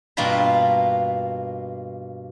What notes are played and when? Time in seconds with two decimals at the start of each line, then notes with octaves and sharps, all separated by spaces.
0.17 G2 B2 A#3 F4 A5 B5